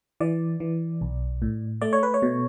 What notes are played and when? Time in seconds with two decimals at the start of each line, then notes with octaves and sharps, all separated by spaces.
0.20 E3 D5
0.60 E3
1.01 B1
1.42 A2
1.81 A3 D5
1.93 C#5
2.03 B4
2.14 C#5
2.22 B2